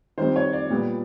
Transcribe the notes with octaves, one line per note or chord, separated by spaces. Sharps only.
D#3 G3 C4 C5
C#5
D5
A#2 G3 B3